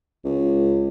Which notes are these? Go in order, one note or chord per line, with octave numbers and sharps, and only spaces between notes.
C#2